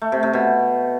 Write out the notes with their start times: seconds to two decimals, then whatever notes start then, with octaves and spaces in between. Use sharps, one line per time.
0.02 A3
0.12 C3
0.23 C3
0.33 B2